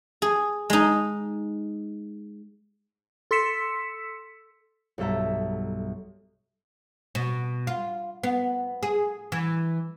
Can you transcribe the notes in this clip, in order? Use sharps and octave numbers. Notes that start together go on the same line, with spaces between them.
G#4
G#3 D#4
A4 C6 E6 B6 C#7 E7
B1 G2 A4 E5 A#5
B2
F4
B3
G#4
E3